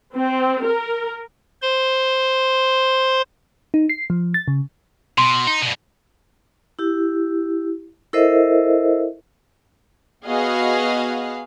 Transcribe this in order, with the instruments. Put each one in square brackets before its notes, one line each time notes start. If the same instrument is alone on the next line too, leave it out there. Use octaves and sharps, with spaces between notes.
[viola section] C4
A#4
[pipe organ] C5 C6
[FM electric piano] D#4
C7
F3
A6
C#3
[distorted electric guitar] B2 [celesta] C6
[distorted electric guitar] D#4
G2 B2
[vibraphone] E4 G4
E4 A4 A#4 C5 D#5 E5
[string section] B3 F#4 G#4 B4 D#5 F5